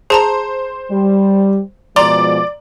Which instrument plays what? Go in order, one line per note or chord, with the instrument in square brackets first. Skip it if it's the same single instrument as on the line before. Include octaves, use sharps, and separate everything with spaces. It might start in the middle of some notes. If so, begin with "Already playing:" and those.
[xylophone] G#4 A5 A#5 [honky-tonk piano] C5
[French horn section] G3
[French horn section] B2 F3 G#3 [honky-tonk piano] D5 [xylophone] A#5 C6